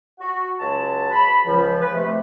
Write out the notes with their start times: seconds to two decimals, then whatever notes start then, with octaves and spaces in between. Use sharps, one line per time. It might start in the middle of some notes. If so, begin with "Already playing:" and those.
0.19 F#4
0.59 C#2 F#3 F#5 A5
1.11 B5
1.46 C#2 F3
1.81 B4
1.93 C3 A3